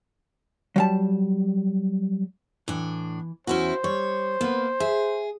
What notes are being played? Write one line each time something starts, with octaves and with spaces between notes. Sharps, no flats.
F#3 G3 A5
A2 E3 D4
E2 C#4 E4 F#4 C5
G3 C#5
A#3 B3 B4
G#4 E5